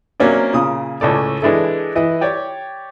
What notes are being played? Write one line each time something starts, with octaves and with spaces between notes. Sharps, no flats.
C3 F#3 A#3 C#4 D4
A#2 C#3 D#6
C#2 A2 A4 D5
E3 G#3 D4 E4 A4
E3 E4 D#5
G4 C#5 D5 G5